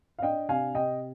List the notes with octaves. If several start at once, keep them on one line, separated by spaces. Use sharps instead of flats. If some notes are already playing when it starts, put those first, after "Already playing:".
F5
D4 D#5 G5
C3 F5 G#5
C3 D#5 G5